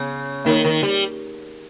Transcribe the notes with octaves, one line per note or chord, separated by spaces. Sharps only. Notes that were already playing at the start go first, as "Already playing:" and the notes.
Already playing: C#3 B3
D#3 A#3 D#4 A#4 C#5
D#3
G3